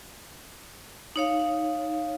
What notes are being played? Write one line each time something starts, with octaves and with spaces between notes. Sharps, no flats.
D#4 C#5 F5